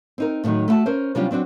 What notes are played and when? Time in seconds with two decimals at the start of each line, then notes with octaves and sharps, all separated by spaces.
0.18 C4 D#4 A#4
0.44 A2 D3 D#3 F#3 D#4
0.68 A3 E4 F#4 A4 A5
0.86 C#4 A#4 C5
1.15 C3 F#3 G3 C#4 D4 F4
1.31 F#3 C4 D4 F#4